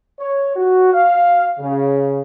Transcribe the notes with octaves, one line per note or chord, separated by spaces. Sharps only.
C#5
F#4
F5
C#3